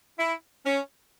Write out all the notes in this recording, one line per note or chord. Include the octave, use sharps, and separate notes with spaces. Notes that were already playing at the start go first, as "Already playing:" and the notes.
E4
C#4